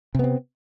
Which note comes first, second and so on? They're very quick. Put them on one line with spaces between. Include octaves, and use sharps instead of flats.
C3 B3 C4